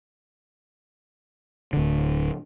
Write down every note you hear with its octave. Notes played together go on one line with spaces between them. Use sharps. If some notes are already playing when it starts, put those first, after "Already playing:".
D1 D3